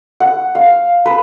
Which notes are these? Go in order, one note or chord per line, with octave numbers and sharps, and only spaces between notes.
F#5
F5
B4